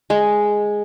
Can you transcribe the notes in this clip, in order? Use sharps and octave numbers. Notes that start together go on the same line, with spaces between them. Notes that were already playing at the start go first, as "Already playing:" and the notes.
G#3